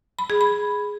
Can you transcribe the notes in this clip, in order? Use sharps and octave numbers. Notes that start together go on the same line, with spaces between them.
B5
G#4
B5